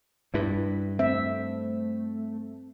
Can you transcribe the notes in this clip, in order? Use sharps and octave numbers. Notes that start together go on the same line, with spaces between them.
G2 E4 B4 B6
A3 C4 E5